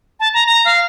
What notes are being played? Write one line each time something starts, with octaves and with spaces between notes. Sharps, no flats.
A5
A#5
A#5
F5